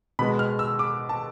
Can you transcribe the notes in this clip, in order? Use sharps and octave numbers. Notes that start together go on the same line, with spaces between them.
B2 G#3 B3 B5
F6
E6
D6
A5